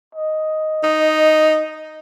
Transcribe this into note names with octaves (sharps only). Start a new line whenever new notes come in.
D#5
D#4